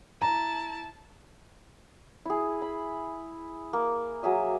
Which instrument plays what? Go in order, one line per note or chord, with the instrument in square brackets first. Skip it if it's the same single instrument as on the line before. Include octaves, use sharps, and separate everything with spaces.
[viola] E4 A5 [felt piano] A#5
[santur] E4 G#4
B5
A#3
F#3 G#4 E5 D#6